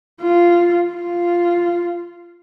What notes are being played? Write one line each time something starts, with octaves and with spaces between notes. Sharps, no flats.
F4
F4